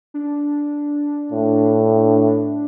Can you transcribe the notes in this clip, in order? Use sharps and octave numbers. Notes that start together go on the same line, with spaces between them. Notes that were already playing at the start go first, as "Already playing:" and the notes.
D4
A2